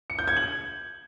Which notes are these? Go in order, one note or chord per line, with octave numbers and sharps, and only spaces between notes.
C#7
G6
G#6
F#7